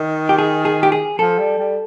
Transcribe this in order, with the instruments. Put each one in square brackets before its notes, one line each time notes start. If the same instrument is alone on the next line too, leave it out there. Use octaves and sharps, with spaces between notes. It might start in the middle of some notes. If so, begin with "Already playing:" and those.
Already playing: [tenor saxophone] D#3
[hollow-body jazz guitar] G4
G#4
G#4
G4
G#4
[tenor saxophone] F3 [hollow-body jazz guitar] A4
[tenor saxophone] G3
G3